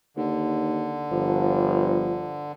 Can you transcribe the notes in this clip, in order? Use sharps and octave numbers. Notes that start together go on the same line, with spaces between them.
D#2 D3
G1 F3